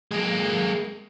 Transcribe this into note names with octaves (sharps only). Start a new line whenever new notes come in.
G#3 A#3